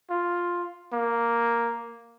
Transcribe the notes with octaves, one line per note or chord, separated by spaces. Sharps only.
F4
A#3